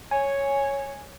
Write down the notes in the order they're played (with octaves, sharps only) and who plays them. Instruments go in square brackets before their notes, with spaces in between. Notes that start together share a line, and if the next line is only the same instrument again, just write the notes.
[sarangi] C#5 [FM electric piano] G#5